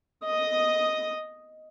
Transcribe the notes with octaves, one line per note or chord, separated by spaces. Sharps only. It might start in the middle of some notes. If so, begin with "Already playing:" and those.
D#5 D#6